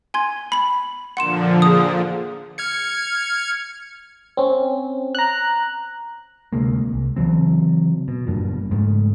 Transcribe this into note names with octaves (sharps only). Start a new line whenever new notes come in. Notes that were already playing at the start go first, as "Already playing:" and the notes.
G#5 C6 G#6
B5 F#7
A#2 D3 F3 F#5 C6 E7
G#4 D#6
F6 G#6 C#7
C4 C#4
A#5 F#6
D2 C3 G#3 A#3
C2
C#3 E3 F#3 C4
B2
F#1 G2 A#2
G#2 C#3 A3